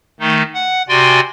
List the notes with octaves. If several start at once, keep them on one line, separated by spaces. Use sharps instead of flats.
D#3 A3 D#4
F#5
C3 F#4 D5 G5 G#5 C6